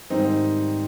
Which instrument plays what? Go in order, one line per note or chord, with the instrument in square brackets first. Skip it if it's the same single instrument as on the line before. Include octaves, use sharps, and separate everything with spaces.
[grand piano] G#2 D#3 G3 C4 D#4